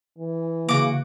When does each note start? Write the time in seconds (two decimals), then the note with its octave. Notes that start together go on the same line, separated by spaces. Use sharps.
0.19 E3
0.69 C#3 A#3 F#4 D6